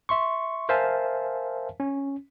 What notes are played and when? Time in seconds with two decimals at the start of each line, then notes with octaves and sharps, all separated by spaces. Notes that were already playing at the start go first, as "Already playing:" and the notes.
0.09 E5 C6 C#6
0.69 A#4 C5 E5 F5 G#5 A5
1.80 C#4